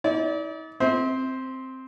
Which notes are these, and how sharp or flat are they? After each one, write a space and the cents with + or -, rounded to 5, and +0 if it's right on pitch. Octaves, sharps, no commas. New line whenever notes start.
D#4 +45 D5 -25
C4 +0 C5 +0 E5 -40